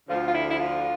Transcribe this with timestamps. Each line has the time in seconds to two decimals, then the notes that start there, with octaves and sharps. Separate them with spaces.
0.08 D2 D3 F3 F4
0.26 F4
0.33 E4
0.48 E4
0.58 F4